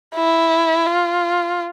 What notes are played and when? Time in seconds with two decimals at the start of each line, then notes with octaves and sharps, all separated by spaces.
0.16 E4
0.87 F4